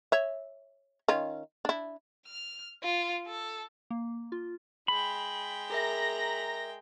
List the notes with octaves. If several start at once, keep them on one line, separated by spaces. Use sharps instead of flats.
C#5 E5
D#3 C#4 F4
D4 E4
F6
F4
A4
A#3
F4
G#3 G5 B5
G#4 A#4 E5 A#5 A#6